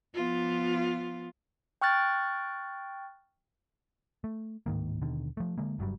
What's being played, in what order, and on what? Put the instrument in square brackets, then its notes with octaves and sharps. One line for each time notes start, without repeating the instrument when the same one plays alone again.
[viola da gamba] F3 B3 F4
[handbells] G5 C#6 F6 F#6 A6
[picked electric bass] A3
D1 G#2 D#3 A#3
D#2 B2 D3 D#3
F3 A3
D3 G#3 A#3
F#1 G2 F#3 G3